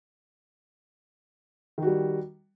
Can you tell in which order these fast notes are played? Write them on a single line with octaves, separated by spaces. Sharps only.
D#3 F#4 G3